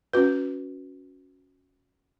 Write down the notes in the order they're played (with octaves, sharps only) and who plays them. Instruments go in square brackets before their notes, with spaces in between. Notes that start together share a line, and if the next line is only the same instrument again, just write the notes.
[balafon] C#4 F#4 B4